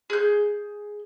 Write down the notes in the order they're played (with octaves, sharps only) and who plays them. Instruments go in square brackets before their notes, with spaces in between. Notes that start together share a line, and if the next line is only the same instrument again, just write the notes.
[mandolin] G#4 G6